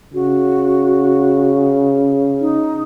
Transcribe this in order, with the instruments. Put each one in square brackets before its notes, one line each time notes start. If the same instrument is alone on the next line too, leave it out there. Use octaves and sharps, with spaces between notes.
[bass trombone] C#3 [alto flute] F#4
[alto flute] D#4